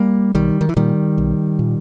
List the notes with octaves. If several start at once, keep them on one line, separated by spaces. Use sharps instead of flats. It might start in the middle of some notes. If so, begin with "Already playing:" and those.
Already playing: G3 A#3
B1 D#3 G3
D#3
E3
A#2 D#3 G3
B1
A#2